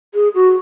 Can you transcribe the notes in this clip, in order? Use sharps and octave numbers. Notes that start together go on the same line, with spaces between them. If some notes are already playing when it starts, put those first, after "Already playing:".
G#4
F#4